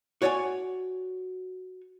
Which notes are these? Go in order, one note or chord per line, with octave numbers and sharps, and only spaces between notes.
F#4 C#5 D5 F5 G#5